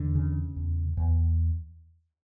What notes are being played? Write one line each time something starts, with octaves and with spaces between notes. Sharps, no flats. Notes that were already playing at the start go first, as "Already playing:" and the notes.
Already playing: E2 D3
C#3
E2
E2